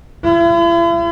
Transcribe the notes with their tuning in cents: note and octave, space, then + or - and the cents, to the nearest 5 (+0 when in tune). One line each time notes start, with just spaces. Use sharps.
E4 +45